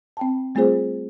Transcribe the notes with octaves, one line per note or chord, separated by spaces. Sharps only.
C4 G5 A5
G3 A3 C4 F4 G#4 C5